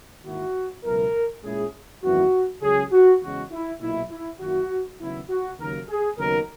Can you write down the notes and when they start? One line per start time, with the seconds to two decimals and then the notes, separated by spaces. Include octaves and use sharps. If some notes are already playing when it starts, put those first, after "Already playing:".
0.25 G#2 D#3 A#3 E4 F#4
0.84 C#2 B2 F#3 B3 E4 A#4
1.44 A#2 G#3 C#4 E4 G#4
2.03 G#1 F#2 E3 B3 E4 F#4
2.62 C#2 C#3 F#3 C#4 G#4
2.92 F#4
3.22 E2 C#3 G#3 C#4 F#4
3.51 E4
3.81 B1 A#2 A#3 D#4 E4
4.10 E4
4.40 F#2 D#3 A#3 E4 F#4
5.00 D#2 C#3 F#3 B3 E4
5.30 F#4
5.59 D#2 C#3 F#3 A#4
5.88 G#4
6.18 D#2 C#3 F#3 B3 D#4 A#4